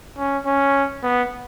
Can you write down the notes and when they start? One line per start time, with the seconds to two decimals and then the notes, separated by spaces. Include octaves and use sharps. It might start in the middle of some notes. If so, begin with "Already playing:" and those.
0.18 C#4
0.46 C#4
1.03 B3